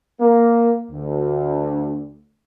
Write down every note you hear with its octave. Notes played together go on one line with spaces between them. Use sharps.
A#3
D2